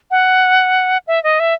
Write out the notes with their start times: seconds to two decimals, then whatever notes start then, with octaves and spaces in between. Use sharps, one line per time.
0.11 F#5
1.07 E5
1.24 D#5
1.40 E5